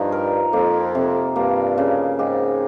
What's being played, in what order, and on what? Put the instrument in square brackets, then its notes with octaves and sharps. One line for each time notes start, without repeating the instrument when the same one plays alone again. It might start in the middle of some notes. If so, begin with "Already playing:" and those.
Already playing: [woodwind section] G2 [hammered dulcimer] F3 D#4
[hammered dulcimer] A#4
[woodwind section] F2 [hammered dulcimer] A#3
[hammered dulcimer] C3
[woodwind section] G2 [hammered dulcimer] A#3
[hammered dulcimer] C#3
[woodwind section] G#2 [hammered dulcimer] G4